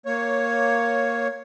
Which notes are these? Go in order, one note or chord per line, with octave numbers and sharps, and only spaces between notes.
A#3 C#5